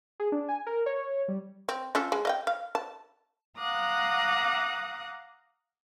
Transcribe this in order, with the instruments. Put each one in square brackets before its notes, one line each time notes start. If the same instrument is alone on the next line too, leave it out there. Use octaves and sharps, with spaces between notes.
[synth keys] G#4
D4
G#5
A#4
C#5
G3
[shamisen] C4
C#4 F4 A4
G#3
D#5 F5 G5
F5
A5
[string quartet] F5 F#5 A#5 D6 D#6 F#6